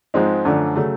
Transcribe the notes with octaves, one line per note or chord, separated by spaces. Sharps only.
G#2 F3 G#3 C4 D#4
F#2 D3 F3 A3 D4
C#3 F#3 A3